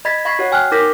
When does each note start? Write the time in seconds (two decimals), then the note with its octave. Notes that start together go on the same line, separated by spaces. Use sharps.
0.05 D#5 B5 G#6 A6 B6
0.25 F5 B5 C#6 G#6 B6 C7
0.39 F#4 C#5 F#5
0.52 G5 G#5 F6 F#6
0.72 D#4 A#4 D6 G6 A#6 B6